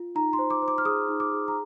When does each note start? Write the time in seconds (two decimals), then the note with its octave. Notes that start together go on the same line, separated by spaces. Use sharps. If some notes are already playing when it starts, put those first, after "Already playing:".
Already playing: F4
0.15 D#4 A#5
0.33 C6
0.39 C5
0.50 D6
0.62 C5
0.68 D6
0.78 F6
0.85 G#4 D#6
1.09 D#4
1.20 D6
1.32 G#4
1.48 A#5